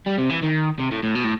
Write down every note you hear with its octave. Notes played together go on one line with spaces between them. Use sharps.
G3
C3
E3
D#3
C3
A2
A2
B2
A2